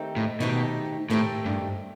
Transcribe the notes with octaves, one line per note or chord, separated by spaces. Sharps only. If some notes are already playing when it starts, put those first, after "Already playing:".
Already playing: D#3 A3 C4 D#4 G4
A2
B2 D#3 A3 C4 D#4 G4
A2 D#3 A3 C4 D#4 G4
G2